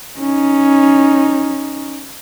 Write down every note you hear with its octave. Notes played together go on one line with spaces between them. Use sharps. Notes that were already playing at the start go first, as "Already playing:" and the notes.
C#4 D#4